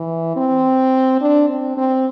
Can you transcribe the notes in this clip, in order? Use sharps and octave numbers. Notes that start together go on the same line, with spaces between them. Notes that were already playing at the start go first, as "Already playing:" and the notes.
Already playing: E3
C4
D4
C4
C4